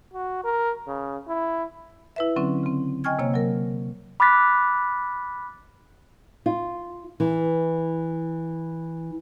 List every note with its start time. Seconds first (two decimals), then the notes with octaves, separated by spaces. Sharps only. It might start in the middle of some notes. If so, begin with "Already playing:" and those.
0.14 F#4
0.44 A#4
0.88 C#3
1.28 E4
2.16 E4 B4 E5
2.36 D3 F#3 C4 C#4
2.63 C#3 C4
3.04 D#5 G5 G#5 C#6 F6 G#6
3.19 C3 A#3 C#5 E6
3.34 F#3 A#4
4.20 B5 D6 F6 F#6 A6 B6
6.46 F4
7.20 E3